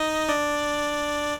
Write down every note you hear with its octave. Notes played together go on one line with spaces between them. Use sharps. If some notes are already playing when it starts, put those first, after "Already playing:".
Already playing: D#4 D#5
D4 D5